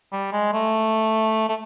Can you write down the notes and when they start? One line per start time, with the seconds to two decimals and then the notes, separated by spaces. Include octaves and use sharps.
0.12 G3
0.33 G#3
0.53 A3
1.49 A3